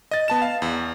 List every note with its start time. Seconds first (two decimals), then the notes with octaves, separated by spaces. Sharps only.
0.11 D#5 A6
0.28 B3 A5 E7
0.42 F5
0.62 E2